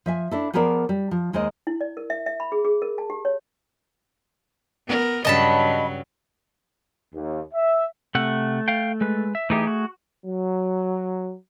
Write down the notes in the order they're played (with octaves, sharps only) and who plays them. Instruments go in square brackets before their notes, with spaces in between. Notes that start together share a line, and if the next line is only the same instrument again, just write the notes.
[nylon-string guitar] F3 E5 G#5
D4 E4 A4
F3 B3 G#4 A#4 C5 D5
G3
F3
D#2 G#3 A#4 C5 D#5
[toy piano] E4
D5
A#4
E5
E5
B5
G#4
G#4
A#4
A5
G4
C#5
[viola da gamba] B3 A#4
[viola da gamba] G2 C#3 F#3 [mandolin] D#5 A5 B5
[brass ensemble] D#2
E5
[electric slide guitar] C3 F#5 [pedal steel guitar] A3
[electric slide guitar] F5 G5
G#3 B4
E5
[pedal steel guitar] E3 D#4 G4 [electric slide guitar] A3 G#4
[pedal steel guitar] F#4
[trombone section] F#3